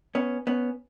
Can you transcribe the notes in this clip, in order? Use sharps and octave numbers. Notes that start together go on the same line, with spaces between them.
B3 C#4
B3 C#4